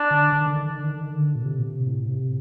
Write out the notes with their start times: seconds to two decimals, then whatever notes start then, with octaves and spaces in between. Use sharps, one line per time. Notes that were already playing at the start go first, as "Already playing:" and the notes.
Already playing: D4
0.11 D3
0.32 D3
0.40 D#3
0.47 D3
0.55 D#3
0.64 D3
0.71 D#3
0.78 D3
0.87 D#3
0.94 D3
1.02 D#3
1.10 D3
1.35 A#2
1.42 C3
1.59 A#2
1.64 C3
1.86 A2
2.08 C3